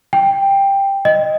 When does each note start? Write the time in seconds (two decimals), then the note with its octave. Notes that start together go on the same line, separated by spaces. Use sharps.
0.13 G5
1.05 D#5